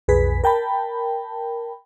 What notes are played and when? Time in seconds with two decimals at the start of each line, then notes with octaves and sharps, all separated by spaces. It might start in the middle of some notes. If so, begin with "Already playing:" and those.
0.08 B1 F2 G#4 B4 B6
0.44 A#4 G5 A5 B5